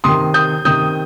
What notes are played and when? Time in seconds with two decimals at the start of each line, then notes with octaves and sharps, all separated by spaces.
0.04 C3 D#3 C6 D#6
0.34 D#6 G6
0.65 C3 D#3 D#6 G6